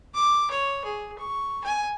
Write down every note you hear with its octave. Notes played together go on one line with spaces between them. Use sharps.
D6
C#5
G#4
C#6
G#5